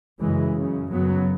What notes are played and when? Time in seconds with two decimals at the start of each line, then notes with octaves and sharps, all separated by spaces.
0.20 F#2 C#3 E3 G#3
0.56 F#2 C#3
0.92 F#2 C#3 F#3 B3